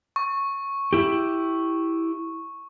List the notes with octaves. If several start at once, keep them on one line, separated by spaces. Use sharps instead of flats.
C#6
E4 G4